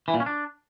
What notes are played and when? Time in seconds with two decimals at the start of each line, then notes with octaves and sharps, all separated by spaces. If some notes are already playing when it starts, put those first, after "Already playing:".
0.08 E3
0.14 A#2
0.20 C#4
0.26 D4